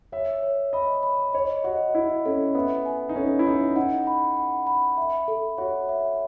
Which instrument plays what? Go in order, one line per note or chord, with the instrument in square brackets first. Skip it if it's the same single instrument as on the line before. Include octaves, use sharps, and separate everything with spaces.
[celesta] C#5 [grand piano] E5
[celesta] C#5
[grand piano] D#5 [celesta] B5
[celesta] B5
[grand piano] C#5 [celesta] D#5
[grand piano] F#4 [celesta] D#5
[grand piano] E4 [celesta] D#5
[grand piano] C#4 [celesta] A4
[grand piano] B3 [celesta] E5
[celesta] G#5
[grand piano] D#4
[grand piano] C#4 [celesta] A4
[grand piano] E4
[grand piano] D#4 [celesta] A4
[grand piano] D#4 [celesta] F#5
[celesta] B5
F#5
B5
E5
A4
[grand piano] F#4 [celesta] C#5
[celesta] E5